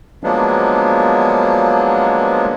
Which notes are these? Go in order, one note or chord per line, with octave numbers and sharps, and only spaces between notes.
F3 F#3 G#3 A#3 B3 D4